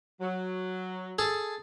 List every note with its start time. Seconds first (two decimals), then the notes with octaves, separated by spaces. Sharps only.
0.20 F#3
1.19 G#4 A4 A5